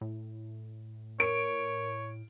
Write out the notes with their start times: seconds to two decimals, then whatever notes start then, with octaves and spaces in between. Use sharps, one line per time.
0.01 A2
1.20 A#4 C#5 D7